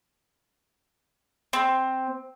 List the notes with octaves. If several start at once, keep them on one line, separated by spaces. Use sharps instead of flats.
C4